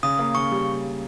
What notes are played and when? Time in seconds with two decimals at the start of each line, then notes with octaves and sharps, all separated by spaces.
0.03 C#3 D#6
0.19 A#3
0.35 C#3 C#6
0.51 G3